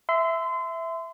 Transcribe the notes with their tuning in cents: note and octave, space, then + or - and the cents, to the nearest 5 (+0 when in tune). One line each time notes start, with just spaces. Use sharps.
E5 +0 C6 -30